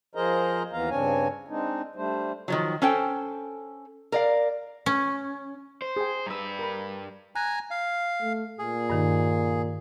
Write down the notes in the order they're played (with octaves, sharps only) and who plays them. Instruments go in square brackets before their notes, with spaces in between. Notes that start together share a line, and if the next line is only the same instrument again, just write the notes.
[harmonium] F3 G#4 A#4 C5 D#5 A#5
D#2 E3 B3 F5 A#5
G2 C#3 C4 D4 C#5 G#5
G#3 C4 D4 D#4
G3 A3 D4 C5
[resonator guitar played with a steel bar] D#3 F3 F#3
C#4 A4 C5 G5
A#4 D5 F5
[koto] C#4
[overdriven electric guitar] C5
[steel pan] G#4 G5
[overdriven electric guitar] G2 B4 [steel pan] A#5 E6
[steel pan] A#4 A#5 B5
[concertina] G#5 A#5 [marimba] F#6
[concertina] F5
[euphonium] A3
[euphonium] A#2 [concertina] G#4
[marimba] G2 D#3 D#4